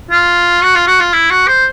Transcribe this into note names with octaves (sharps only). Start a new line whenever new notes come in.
F4
F#4
F4
F#4
F4
E4
F#4
C5